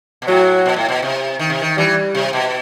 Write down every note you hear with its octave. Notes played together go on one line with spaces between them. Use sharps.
B2
A2 F#3
B2
A2
B2
C3
D#3
C3
D#3
E3 G3
C3
B2